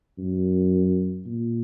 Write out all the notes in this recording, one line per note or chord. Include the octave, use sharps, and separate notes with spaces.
F#2
A#2